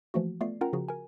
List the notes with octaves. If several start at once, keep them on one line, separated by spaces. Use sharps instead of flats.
E3 F3 A3 A#3 F#4
A3 B3 F4 D5 C7
C#4 F4 A#4 F#5 G5 A#5
C#3 F3 F#4 G#4
A#4 G#5